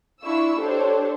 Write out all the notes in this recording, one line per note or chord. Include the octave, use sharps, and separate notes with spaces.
D4 E4 F4 C#6 E6
D4 G4 A4 C5 C#5